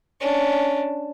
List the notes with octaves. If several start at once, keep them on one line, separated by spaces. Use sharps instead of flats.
C#4 D4